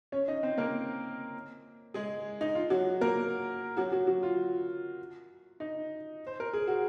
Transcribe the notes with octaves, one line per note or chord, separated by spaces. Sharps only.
C#4 C#5
D#4 D#5
C4 C5
A#3 A#4
G#3 G#4
D#4
F4
F#3 F#4
A#3 A#4
F#3 F#4
F#3 F#4
F#3 F#4
F4
D#4
C5
A#4
G#4
F#4